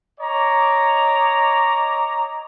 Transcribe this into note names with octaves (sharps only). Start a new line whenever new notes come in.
C#5 D#5 A#5 D6